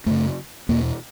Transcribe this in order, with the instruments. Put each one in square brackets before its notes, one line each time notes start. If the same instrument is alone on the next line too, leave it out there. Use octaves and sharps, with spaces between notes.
[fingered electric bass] F#2 C#3 A3
E2 B2 A#3